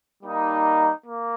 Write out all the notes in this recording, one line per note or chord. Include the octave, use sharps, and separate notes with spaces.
G3 A#3 D#4
A#3